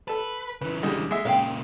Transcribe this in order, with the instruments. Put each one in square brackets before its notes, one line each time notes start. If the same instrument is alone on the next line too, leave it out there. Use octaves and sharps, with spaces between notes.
[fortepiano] A4 A5 [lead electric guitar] B4
[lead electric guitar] C#3 E3 [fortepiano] B4
[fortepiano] D3 G3 G#3
G#3 E5
[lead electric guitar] A#2 C#3 [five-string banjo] F5 G5